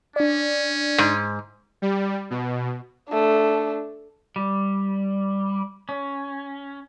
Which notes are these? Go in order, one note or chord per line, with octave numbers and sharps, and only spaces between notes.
C#4 D4 D5
G#2
G3
B2
A3 D4
G3
C#4